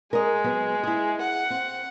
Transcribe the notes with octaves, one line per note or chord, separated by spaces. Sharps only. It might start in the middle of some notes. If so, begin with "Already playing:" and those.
G#3 A#4 D#5
F#3 B3
E4 G#4
F#5
C4